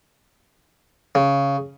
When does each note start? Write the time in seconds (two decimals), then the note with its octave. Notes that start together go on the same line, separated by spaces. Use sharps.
1.15 C#3